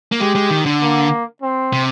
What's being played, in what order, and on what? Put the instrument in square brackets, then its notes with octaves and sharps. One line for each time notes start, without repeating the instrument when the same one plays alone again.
[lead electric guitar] A#3
[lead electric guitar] G#3 [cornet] G4
[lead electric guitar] G#3
D#3
D3
[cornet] A#3
C4
[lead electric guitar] C3